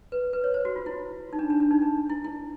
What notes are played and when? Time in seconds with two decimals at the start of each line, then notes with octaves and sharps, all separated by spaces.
0.12 B4
0.33 B4
0.44 C#5
0.54 C5
0.65 F#4
0.76 F4
0.86 E4
1.33 D#4
1.39 D4
1.50 D4
1.60 D4
1.71 D#4
1.82 D4
2.10 E4
2.24 E4